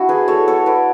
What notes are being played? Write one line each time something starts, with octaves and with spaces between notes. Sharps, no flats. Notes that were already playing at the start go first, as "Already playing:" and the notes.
Already playing: D4 E4 F#4
G#4 B4
A4 C#5
A4 C#5
B4 D5